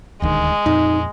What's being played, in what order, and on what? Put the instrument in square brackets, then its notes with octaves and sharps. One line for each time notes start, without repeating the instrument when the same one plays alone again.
[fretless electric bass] D#1 D2 D#3 [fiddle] G#3
[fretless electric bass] F2 A#2 [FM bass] D#4